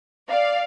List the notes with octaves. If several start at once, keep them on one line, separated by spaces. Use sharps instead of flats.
D5 F5